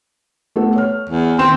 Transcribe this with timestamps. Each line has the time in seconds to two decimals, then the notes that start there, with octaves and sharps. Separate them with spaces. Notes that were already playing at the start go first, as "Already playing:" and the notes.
0.56 A3 B3 A4
0.75 C#5 F6
1.09 E2
1.39 D#2 C4 C6 E7